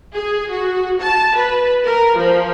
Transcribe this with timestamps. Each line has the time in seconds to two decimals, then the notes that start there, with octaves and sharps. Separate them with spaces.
0.14 G#4
0.52 F#4
1.02 A5
1.37 B4
1.85 A#4
2.17 F3